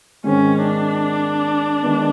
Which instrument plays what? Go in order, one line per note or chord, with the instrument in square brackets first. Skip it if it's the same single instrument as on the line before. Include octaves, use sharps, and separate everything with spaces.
[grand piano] G#2 D#3 G#3 C4 [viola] C#4
[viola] D4
[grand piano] D#3 G#3 B3